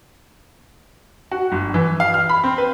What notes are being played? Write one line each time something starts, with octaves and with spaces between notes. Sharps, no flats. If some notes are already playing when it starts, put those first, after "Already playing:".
F#4
G1
E3
F5
F6
B5
C4
B4